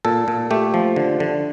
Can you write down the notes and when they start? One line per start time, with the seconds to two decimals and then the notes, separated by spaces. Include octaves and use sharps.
0.05 A#2 A4
0.28 A#2
0.51 A3 G4
0.74 F3
0.96 D3
1.20 D3